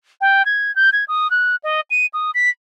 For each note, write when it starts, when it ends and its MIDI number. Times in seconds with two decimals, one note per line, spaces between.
0.21 0.45 79
0.46 0.74 92
0.76 0.90 91
0.93 1.04 92
1.08 1.30 87
1.31 1.56 90
1.64 1.81 75
1.91 2.06 99
2.13 2.31 87
2.35 2.50 95